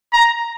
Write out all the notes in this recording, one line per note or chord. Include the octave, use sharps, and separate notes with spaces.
A#5